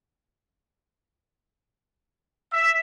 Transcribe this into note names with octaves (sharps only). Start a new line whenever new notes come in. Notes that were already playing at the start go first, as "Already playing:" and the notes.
E5